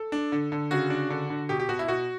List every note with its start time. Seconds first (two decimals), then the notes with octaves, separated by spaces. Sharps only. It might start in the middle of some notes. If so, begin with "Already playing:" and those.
Already playing: A4
0.12 D4
0.32 D3
0.52 D3
0.71 C#3 F#4
0.90 D4
1.10 D3
1.30 D3
1.49 B2 G4
1.60 G4
1.69 B2 F#4
1.79 E4
1.88 B2 F#4